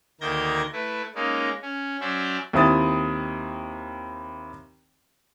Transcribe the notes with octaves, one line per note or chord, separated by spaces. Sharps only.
D2 D#3 A#3 G6 G#6 A#6
A3 E4 B4
G#3 A#3 C#4 D#4
C#4
F#3 C#4 C5 D5 E5
D#2 C4 E4 D#6 A6